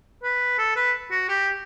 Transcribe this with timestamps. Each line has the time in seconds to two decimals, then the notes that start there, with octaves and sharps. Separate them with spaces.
0.23 B4
0.59 A4
0.76 B4
1.11 F#4
1.29 G4